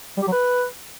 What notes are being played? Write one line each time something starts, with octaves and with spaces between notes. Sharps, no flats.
G3
G4
F#3
B4